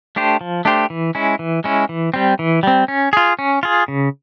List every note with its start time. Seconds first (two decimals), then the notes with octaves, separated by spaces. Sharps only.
0.16 A3 D4 G4 C5
0.41 F3
0.65 A3 D4 G4 C5
0.90 E3
1.15 G#3 C#4 E4
1.39 E3
1.64 G#3 C#4 E4
1.89 E3
2.14 G3 C4
2.39 E3
2.63 G3 C4
2.88 C#4
3.13 F4 G#4
3.39 C#4
3.63 F4 G#4
3.88 C#3